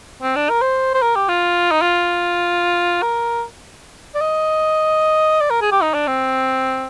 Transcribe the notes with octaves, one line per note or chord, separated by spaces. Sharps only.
C4
D4
A#4
C5
C5
A#4
G4
F4
D#4
F4
A#4
D5
D#5
D5
A#4
G#4
G4
D#4
D4
C4